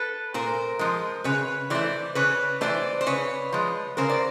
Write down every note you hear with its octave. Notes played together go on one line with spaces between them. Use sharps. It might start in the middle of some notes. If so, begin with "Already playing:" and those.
Already playing: A4 B4
A#2 A#4 C5
F3 G#3
C#3 B4 C#5
E3 A3 C5 D5
C#3 B4 C#5
E3 A3 C5 D5
C5
C#3 B4 C#5
F3 G#3
C#3 A#4 C5
D5